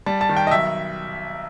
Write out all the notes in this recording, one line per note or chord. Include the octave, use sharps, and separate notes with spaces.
G3 A5
A5
D#3
G5
D#5
B1 E5